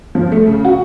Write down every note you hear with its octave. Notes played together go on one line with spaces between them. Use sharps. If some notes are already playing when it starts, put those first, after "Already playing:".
F3
A3
C#3
F#4